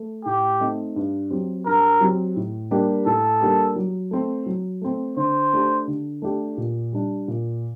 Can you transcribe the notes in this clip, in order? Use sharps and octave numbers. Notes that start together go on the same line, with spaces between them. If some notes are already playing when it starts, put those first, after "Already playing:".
Already playing: A3
A2 G4
A3 C4 D#4
G2
F#3 C4 G4
G2 A#4
F#3 C4 G4
A2
G3 A#3 D4 G4
A2 A4
G3 A#3 D4 G4
F#3
A3 C4
F#3
A3 C4
D3 C5
A3 D4 G4
D3
A3 D4 G4
A#2
G3 D4
A#2